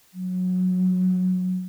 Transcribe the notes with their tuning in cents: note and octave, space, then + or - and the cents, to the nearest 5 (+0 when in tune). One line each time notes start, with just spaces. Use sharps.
F#3 -15